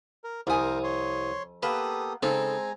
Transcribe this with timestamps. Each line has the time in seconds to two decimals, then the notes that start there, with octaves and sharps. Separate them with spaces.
0.24 A#4
0.47 C2 F2 A#4 C5 G#5 D#6
0.84 C#5 C6
1.63 A#3 B3 G4 A4 B4 D#6
2.23 C#3 G#3 C4 D#4 A4 G#5 A#5